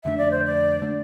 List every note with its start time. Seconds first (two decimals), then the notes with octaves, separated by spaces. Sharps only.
0.04 F2 D3 A3 D4 E5
0.18 D5
0.31 C5
0.45 D5
0.82 D3 A3 D4